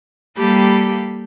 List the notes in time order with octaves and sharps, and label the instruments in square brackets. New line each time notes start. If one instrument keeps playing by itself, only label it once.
[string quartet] G3 A#3 G4 A4 B5